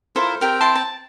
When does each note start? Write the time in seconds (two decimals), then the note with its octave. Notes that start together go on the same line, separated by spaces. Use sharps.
0.16 E4 F4 A4 A#4 C5
0.41 C4 G4 A#4 G5
0.61 E4 A5 C6
0.76 A5